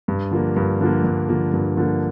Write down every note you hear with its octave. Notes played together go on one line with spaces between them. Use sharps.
G2
D3 F3 A#3
G2
D3 F3 A#3
G2
D3 F3 A#3
G2
D3 F3 A#3